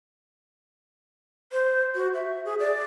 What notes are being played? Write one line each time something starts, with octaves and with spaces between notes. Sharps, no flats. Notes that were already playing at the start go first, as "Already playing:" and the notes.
C5
F#4
E5
G#4
D5